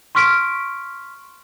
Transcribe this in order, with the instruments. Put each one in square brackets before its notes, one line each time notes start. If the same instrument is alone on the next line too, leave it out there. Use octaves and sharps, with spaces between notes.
[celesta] C6 C#6 F6 B6 D7